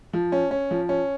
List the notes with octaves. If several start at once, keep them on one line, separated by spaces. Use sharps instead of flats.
F3
C#4
C#4
F3
C#4